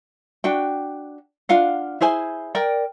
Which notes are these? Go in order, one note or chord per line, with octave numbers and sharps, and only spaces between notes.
D4 F#4 G5
D4 F4 F5 F#5
E4 G#4 C5 G#5
A#4 D5 G5